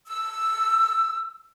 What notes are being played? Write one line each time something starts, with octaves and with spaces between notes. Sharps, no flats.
E6